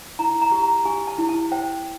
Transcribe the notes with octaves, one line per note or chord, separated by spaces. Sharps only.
E4 A#5
A#5
G4
A#5
G4 G#5
A5
E4
A5
C5 G5